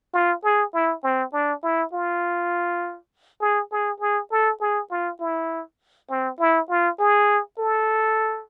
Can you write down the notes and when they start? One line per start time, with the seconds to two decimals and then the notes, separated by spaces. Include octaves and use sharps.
0.14 F4
0.44 G#4
0.74 E4
1.04 C4
1.33 D4
1.63 E4
1.93 F4
3.41 G#4
3.71 G#4
4.00 G#4
4.31 A4
4.61 G#4
4.91 F4
5.20 E4
6.10 C4
6.40 E4
6.69 F4
6.99 G#4
7.59 A4